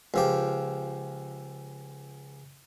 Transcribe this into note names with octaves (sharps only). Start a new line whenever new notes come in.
C#2 F3 G4